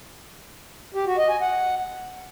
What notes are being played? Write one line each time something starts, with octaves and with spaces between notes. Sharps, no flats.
G4
F#4
D#5
G#5
F#5